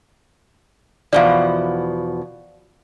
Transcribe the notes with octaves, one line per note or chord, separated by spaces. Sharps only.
E2 B2 F3 D5 F5